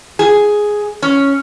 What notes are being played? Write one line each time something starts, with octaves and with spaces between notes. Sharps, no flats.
G#4
C#4